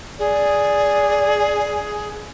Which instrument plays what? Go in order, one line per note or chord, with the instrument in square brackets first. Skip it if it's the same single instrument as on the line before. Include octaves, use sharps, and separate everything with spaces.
[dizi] G#4 [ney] D5